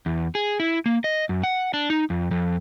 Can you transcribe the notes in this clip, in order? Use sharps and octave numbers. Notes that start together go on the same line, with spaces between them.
E2
G#4
E4
A#3
D#5
F#2
F#5
D4
D#4
F2
F2